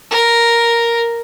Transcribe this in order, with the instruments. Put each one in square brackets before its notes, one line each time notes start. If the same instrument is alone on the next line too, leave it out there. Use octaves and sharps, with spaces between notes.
[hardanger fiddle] A#4